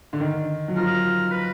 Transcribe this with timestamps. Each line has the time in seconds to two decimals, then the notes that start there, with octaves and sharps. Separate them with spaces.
0.13 D3
0.20 D#3
0.68 F#3
0.76 F3 A#4
1.32 B4